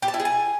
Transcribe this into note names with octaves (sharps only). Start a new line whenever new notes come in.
G4
A5
E4
G#4
G#5